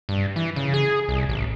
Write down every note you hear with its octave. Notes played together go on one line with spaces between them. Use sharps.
G2
E3
C#3
G#4
C2
A1